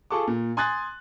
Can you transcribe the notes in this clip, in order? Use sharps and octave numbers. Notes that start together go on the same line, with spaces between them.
F4 G#4 A4 A5 C#6 D6
A#2
G#5 C6 D#6 F#6 G#6 A6